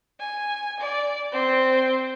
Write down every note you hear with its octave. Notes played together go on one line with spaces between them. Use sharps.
G#5
D5
C4